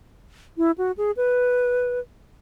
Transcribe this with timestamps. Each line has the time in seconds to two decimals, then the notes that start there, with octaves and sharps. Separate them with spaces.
0.58 E4
0.78 F#4
0.97 G#4
1.17 B4